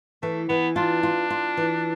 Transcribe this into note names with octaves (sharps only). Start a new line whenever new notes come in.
E3 A3
E3 B3
D4 F4
F4
F4
E3